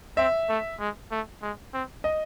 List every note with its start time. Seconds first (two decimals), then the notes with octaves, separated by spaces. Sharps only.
0.17 C4 E5
0.49 A3
0.80 G#3
1.11 A3
1.42 G#3
1.74 C4
2.04 D#5